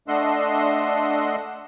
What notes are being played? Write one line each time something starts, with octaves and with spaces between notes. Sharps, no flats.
A3 D4 D#5 F#5 C6 E6